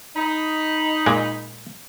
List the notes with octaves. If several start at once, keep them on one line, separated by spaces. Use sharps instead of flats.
D#4 B5
A#2 G#3